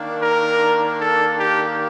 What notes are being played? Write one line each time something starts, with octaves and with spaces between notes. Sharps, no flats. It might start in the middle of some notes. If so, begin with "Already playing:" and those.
Already playing: D#3 A#3 D4
A#4
A4
G4